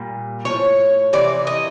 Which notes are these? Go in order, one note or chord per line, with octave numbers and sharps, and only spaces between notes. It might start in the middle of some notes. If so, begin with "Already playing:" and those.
Already playing: A#2 G3
A2 F3 C#5
C3 E3 D5
D#5